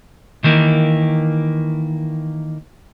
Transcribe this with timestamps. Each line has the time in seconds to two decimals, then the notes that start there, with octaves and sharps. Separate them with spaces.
0.44 D#3 E3 A#3